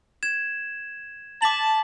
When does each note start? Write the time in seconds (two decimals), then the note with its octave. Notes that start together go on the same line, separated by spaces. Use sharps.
0.23 G#6 E7
1.42 A5 D6 B6 F#7